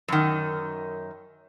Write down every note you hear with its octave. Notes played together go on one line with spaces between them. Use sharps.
F#2 D#3